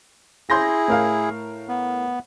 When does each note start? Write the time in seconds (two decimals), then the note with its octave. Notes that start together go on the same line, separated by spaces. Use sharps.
0.50 E4 G#4 C6 G6 A#6
0.88 A2 A#4 F5
1.69 B3